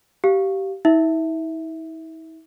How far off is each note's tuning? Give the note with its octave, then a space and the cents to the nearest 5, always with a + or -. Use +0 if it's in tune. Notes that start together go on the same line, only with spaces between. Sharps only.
G4 -20 F5 +0
E4 -45 E5 +0